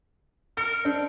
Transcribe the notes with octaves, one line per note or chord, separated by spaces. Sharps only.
A#4 C#7
C4 D4